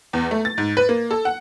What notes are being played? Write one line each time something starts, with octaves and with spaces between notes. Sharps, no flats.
E2
A3
A6
G#2
B4
A#3
A4
F#5